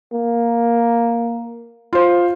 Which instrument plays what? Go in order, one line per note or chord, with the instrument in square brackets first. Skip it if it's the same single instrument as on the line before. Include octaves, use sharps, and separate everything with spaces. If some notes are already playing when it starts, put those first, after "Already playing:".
[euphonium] A#3
[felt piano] F4 C5